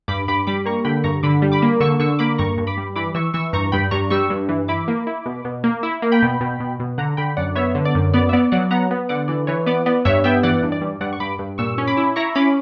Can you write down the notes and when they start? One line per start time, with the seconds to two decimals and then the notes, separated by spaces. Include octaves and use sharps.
0.08 G2 B5 D6
0.28 G2 B5 D6
0.47 G3 B5 D6
0.66 A#3 A#5 C#6
0.85 D3 G5 B5
1.04 G2 A#5 C#6
1.23 D3 B5 D6
1.42 G3
1.52 B5 D6
1.62 A#3
1.80 D3 C#6 E6
2.00 D3 C#6 E6
2.19 A#3 B5 D6
2.38 G2 A#5 C#6
2.58 G2
2.67 B5 D6
2.77 G3
2.96 E3 B5 D6
3.15 E3 C#6 E6
3.34 E3 C#6 E6
3.53 G2 A#5 C#6
3.72 G2 G5 B5
3.91 G2 A#5 C#6
4.10 G3 C#6 E6
4.30 G2
4.49 E3
4.68 E4 B5 D6
4.88 A#3
5.07 E4
5.26 B2
5.45 B2
5.64 A#3
5.83 E4
6.02 A#3
6.12 G5 B5
6.22 B2
6.41 B2
6.60 B2
6.80 B2
6.98 D3 F#5 A#5
7.17 D3 G5 B5
7.37 F#2 D5 F#5
7.55 B3 C#5 E5
7.75 D3
7.85 D5
7.95 F#2
8.14 B3 D5
8.29 E5
8.33 B3 D5
8.52 F#3 D5 F#5
8.71 B3 F#5 A#5
8.91 B3
9.09 D3 D5 F#5
9.28 E3 D5
9.47 E3 C#5
9.66 B3 D5
9.86 B3 D5
10.05 G2 C#5 E5
10.24 B3 E5 G5
10.43 E3 D5 F#5
10.63 G2
10.72 D5
10.81 G2
11.01 G2 D5 F#5
11.13 C#6
11.20 G2 B5 D6
11.39 G2
11.58 A#2 C#6 E6
11.78 C#4
11.87 B5 D6
11.97 E4
12.16 E4 A#5 C#6
12.35 C#4 B5 D6